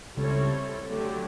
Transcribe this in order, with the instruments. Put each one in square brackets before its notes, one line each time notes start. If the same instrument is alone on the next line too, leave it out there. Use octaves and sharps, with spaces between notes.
[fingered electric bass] C#2 C#3 [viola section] G3 C4 E4 A4 C#5
[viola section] D3 F#3 A3 D4 G4